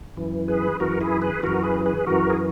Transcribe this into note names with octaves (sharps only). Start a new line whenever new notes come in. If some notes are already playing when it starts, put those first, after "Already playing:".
F#2 E3
G#4 B4
F#2 E3 F#4 A#4
E4 G#4
G#4 B4
F#2 E3 F#4 A#4
G#4 B4
G#4 B4
F#2 E3 F#4 A#4
G#4